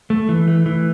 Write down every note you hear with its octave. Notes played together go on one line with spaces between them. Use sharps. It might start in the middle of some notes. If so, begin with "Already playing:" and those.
A3
E3
A3
E3